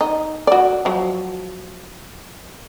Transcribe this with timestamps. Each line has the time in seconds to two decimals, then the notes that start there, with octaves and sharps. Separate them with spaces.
0.01 D#4
0.47 F#4 D5
0.85 F3 F#3